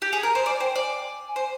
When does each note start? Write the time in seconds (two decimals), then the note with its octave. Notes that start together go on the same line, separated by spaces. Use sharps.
0.02 G4
0.13 G#4
0.23 A#4
0.35 C5
0.46 D5 G#5
0.60 C5 G5
0.75 D5 G#5
1.02 G#5
1.28 G#5
1.36 C5